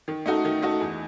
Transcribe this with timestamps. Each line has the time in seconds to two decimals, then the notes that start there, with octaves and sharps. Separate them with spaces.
0.08 D#3
0.26 A3 D#4 F#4
0.45 D#3
0.62 A3 D#4 F#4
0.81 E2